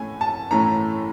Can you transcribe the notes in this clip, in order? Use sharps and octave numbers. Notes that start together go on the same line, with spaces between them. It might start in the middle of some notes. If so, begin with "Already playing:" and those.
Already playing: A2 E3 A3 C#4 G#5
A5
A2 E3 A3 C#4 A#5